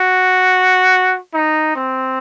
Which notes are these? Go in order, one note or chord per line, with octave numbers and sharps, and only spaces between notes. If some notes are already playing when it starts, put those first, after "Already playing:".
Already playing: F#4
D#4
C4